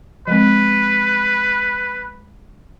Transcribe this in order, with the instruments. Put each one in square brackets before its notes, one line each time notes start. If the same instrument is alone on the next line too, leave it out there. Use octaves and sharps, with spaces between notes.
[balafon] F3 G#3 C4 [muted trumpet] B4